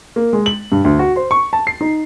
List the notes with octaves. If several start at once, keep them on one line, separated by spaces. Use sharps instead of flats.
A#3
G#3
F#7
G2
D2
F#4
C5
C#6
A5
C7
D#4